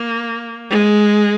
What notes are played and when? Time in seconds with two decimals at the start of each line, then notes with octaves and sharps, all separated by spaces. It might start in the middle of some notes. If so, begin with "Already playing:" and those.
Already playing: A#3
0.70 G#3